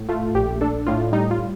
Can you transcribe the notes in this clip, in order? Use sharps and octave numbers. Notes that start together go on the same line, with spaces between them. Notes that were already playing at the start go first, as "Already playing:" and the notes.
Already playing: A2
A3 F4
A#1 G4
D4 A4
A2 F4
G3 D#4
F4